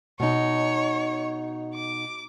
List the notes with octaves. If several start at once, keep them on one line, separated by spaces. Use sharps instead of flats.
B2 D#4 C#5
D6